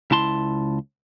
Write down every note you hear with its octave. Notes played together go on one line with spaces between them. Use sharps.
C#2 E4 A5 C6